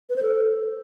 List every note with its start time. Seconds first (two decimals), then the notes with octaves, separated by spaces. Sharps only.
0.10 B4
0.16 C5
0.23 A4